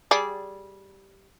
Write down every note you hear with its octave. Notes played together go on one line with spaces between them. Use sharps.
G3 G#4 D5